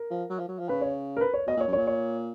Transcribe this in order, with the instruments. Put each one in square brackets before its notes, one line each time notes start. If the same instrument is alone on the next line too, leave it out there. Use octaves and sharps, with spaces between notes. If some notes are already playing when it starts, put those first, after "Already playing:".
Already playing: [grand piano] A#4
[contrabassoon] F3
F#3
F3
F#3
F3
[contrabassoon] C#3 [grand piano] B4
[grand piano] C#5
A#4
B4
C#5
[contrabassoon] B2 [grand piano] D#5
[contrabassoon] A#2
[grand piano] C#5
[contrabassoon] F#2
[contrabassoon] A#2 [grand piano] C#5
[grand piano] C#5